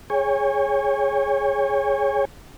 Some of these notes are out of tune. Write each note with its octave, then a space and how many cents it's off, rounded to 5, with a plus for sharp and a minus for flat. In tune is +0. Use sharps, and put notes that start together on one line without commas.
G#4 +0 C#5 +0 G#5 -45